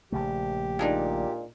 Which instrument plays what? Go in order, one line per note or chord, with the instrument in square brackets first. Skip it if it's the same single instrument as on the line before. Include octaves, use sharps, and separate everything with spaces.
[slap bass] A#1 C#3 A3 [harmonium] G4
[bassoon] A#2 [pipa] G#3 D4 D#4